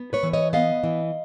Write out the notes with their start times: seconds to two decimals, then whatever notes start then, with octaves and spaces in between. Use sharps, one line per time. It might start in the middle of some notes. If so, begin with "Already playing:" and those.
Already playing: B3
0.13 B4 C#5
0.23 E3
0.33 C#5 D#5
0.53 B3 D#5 F5
0.83 E3